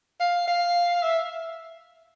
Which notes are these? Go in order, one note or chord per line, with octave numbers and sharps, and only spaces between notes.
F5
F5
E5